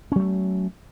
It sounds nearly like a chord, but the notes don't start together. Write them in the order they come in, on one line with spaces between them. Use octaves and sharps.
C#4 F#3 A3